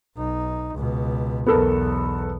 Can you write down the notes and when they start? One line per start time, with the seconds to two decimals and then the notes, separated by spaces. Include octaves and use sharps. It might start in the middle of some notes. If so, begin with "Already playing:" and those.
0.17 B1 D#4
0.74 C#2 B2
1.46 B1 E2 B3 A4 A#4